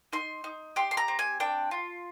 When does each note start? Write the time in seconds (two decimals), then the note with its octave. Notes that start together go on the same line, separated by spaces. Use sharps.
0.13 D#4 C6
0.44 D#4
0.76 G4 C6
0.91 C6
0.97 A#5
1.08 C4
1.19 G#5
1.40 D4 G5
1.71 F4